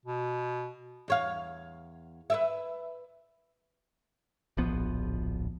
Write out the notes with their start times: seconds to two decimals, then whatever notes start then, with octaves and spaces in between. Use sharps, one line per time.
0.06 B2
1.08 E2 C#5 F5
2.30 B4 D5 E5
4.57 D1 A#1 F3 B3